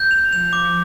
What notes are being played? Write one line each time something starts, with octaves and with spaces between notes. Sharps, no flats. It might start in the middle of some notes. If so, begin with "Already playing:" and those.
Already playing: G6
F7
F3 F7
D6